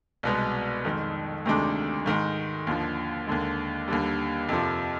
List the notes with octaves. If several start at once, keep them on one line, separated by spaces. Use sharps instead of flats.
C2 B2 G#3 B3
F2 D#3 G#3
D2 C3 D#3 G#3 D4
G#2 D#3 G#3
D#2 D3 F3
D#2 D3 G#3
D#2 D3 G3
F2 C3 F3